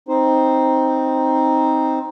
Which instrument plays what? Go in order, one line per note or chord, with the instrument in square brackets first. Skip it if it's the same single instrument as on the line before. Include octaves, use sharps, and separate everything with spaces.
[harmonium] C4 D#4 C5